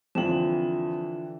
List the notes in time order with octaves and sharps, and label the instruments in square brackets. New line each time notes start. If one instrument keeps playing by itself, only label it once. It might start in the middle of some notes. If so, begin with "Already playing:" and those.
[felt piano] F2 [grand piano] D3 E3 F#7 [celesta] F4 G5 E7